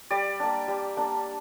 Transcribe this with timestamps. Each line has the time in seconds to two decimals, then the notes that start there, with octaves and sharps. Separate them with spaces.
0.11 G3 D5
0.40 A#3 D4
0.68 G3
0.97 A#3 D4